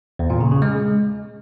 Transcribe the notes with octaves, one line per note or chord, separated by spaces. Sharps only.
E2
A#2
C#3
C#3
G#3